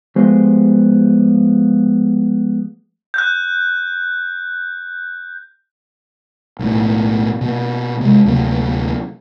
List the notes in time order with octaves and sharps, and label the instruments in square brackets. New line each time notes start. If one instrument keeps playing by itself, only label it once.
[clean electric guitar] F3 G#3 A3 B3 G4 C5
[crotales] F#6 G6
[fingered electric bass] B1 A2
B2 A#3
C3 G#3
D2 C3 F#3 A#3